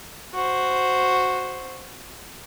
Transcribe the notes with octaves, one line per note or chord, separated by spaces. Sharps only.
F#4 C5